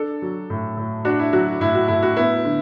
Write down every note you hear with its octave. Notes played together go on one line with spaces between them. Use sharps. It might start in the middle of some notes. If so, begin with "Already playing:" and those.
Already playing: D4 A4
F#3
A2
A2
D4 F#4
E4
F#3 F#4
A2 E4
F#4
A2 E4
F#4
B3 E4
D3